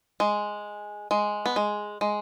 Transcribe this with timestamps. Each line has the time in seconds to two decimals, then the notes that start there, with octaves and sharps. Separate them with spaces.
0.20 G#3
1.11 G#3
1.46 B3
1.56 G#3
2.01 G#3